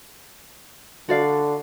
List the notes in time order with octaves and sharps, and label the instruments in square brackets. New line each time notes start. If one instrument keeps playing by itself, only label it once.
[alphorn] D3 [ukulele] F#4 D5 F5